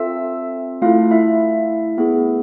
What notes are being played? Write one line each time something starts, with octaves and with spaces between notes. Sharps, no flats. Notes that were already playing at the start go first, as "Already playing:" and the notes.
Already playing: C4 F4 A4 E5 E6
A3 E4 F4 A4 F5
E4 E5
B3 E4 G#4